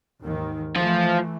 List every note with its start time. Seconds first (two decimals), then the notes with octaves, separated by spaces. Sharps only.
0.23 D#2 G#2 D#3
0.76 E3 F3 A3 F4